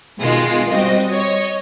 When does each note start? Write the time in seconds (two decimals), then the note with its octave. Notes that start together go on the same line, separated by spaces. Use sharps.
0.20 B2 D#3 G#3 F4
0.71 G3 C4 F#4 D#5
1.08 C#5 D#5